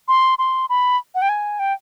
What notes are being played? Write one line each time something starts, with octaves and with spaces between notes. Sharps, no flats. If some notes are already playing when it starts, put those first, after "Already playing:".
C6
C6
B5
F#5
G5
G#5
G5